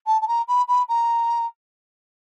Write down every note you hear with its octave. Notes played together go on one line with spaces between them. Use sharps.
A5
A5
A#5
B5
B5
A#5